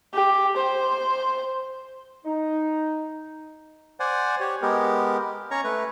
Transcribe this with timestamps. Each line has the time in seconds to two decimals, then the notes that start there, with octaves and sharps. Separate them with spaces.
0.14 G4
0.57 C5
2.25 D#4
4.00 C5 D5 F#5 G#5
4.40 G4 C#5
4.62 G#3 B3 G4 A#4
5.51 C#4 C#5 A#5 C#6
5.64 A3 B4